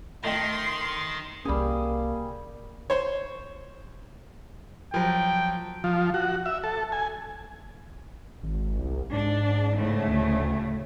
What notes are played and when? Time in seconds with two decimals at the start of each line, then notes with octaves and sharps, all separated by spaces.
0.24 D#3 A3 D#5 G5 C6
1.45 C2 G3 A#3 C#4 G#4
2.90 C5 C#5
4.94 F3 F#3 G5
5.84 F3
6.14 F#4
6.46 E5
6.64 A4
6.92 G#5
8.43 G#1
8.79 C2
9.12 G#2 D4
9.76 A2 C#3 A3
10.08 D2